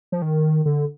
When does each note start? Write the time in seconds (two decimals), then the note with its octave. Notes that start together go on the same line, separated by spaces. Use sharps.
0.12 F3
0.22 D#3
0.65 D3